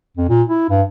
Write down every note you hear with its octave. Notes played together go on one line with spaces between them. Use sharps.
F2
A#2
E4
G2